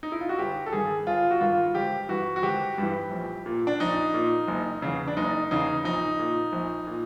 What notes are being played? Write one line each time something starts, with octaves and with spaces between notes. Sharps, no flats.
D#4
E4
F4
F#4
G1 G4
A4
G2 D#3 G#4
G1 F4
F#4
G2 D#3 F4
G#1 G4
G2 E3 F#4
F#4
G#1 G4
G2 E3
A#1
A#2
D4
A#1 D#4
A#2
F#1
E2 C#3
D4
F#1 D#4
E2 C#3 D#4
A#1 D#4
A#2
A#1
A#2